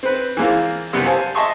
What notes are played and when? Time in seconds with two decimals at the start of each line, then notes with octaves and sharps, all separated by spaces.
0.03 C4 B4
0.37 E3 G#3 A#3 C4 F4
0.93 F#2 C3 G3 B3
1.05 C5 F5 G#5 A5
1.35 D#5 E5 G#5 A5 C6 C#6